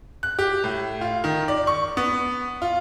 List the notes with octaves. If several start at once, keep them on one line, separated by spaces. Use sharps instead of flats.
F#6
G4
A2
F4
D#3
D5
C#6
B3
F4